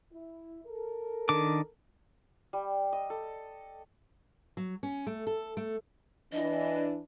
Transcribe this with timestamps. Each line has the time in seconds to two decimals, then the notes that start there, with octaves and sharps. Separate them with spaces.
0.11 E4
0.65 A4 A#4
1.29 D#3 D4 D6
2.53 G3
2.93 D#5
3.10 A4
4.57 F#3
4.83 C#4
5.07 A3
5.27 A4
5.57 A3
6.32 E3 D4 D#5